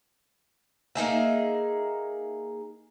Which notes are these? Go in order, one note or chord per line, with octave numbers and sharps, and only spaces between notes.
A#3 D#4 G#4 E5